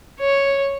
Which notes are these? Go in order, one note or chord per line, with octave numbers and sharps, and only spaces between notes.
C#5